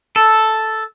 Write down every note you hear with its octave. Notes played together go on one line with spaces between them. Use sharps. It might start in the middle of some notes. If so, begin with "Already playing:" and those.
A4